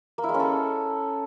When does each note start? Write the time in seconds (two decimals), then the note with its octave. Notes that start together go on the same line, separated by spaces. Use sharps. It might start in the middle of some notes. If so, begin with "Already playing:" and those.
0.18 A#3
0.23 E4
0.29 G#3
0.34 C#4
0.40 A4